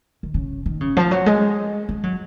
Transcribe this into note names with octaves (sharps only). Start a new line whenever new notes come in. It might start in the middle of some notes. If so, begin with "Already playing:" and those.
D#3
C#3
D#3
C#3
F3
F#3
G#3
G#3
F#3